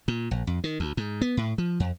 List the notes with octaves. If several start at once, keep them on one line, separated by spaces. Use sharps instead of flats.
A#2
A#1
F2
D#3
D2
G#2
B3
A2
F3
F2